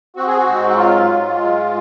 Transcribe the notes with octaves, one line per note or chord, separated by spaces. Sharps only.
C4 F#4
G#4
F#4
G#2
F#4
F#3 F4
G#2
G#3